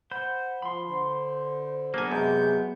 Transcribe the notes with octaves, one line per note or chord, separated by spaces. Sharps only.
C5 F#5 B5 G6
F3 B5 C6
D3 C5
F#3 A#3 B3 D4 G#4 G#5
F#2 C3 G#3 G#4 G6